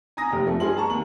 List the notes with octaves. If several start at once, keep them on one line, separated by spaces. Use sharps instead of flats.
G#5 A#5 D#6 A#6
F1 G4
F3 A3
G2 G#4 C6 F#7
A5 A#5 C#6
D#2 F#7